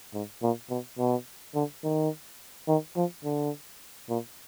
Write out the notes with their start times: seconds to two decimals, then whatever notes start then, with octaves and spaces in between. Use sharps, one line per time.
0.14 G#2
0.42 A#2
0.70 B2
0.99 B2
1.55 D3
1.84 D#3
2.68 D#3
2.96 F3
3.24 D3
4.09 A#2